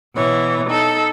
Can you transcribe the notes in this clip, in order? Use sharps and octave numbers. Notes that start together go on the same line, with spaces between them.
B2 E3 C#5
D#4 A4